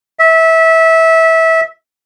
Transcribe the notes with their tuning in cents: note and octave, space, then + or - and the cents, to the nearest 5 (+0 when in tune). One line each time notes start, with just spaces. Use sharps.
E5 -20